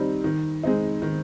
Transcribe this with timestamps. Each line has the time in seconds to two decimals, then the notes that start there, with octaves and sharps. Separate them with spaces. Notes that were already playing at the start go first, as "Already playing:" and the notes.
Already playing: D#3 G3 C4 D#4
0.24 D#3
0.63 G#3 C4 D#4
1.02 D#3